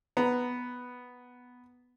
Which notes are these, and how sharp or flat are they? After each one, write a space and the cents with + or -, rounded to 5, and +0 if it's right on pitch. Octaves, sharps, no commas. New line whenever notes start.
B3 +0 A#5 +0